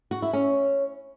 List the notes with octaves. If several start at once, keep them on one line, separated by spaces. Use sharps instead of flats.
F#4
E4
C#4